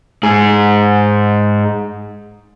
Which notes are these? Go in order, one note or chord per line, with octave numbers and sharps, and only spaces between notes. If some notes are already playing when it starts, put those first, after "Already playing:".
G#2 G#4